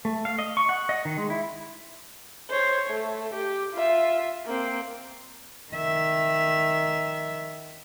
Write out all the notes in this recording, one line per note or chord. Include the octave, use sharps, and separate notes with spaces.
A3
F5
D#5
C#6
F#5
D#5
D#3
G#3
E4
C5 C#5
A3
G4
F4 E5
A#3 C4
D#3 E5